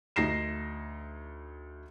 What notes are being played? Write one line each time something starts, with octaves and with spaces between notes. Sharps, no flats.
D2 D#4 A#6 C7 E7